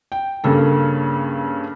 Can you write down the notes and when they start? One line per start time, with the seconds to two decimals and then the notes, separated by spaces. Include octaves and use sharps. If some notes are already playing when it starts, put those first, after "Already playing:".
0.12 G5
0.44 G2 C#3 A#3 A4